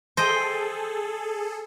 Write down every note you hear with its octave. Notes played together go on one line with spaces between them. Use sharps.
G#4 A4 C5 D#5 G5